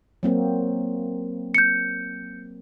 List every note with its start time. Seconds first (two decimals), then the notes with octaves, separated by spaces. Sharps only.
0.23 F#3 A#3 C4
1.54 G6 C#7